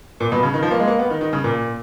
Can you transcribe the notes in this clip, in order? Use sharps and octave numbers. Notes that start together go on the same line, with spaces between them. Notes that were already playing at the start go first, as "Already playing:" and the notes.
A#2
B2
C#3
D#3
F3
A#3
G#3
A#3
B3
D#3
D#3
C#3
A#2